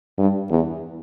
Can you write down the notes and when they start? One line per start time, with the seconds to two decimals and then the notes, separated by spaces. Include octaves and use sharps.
0.18 G2
0.50 E2